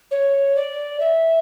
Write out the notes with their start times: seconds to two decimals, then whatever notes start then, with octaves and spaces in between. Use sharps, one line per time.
0.11 C#5
0.56 D5
1.00 E5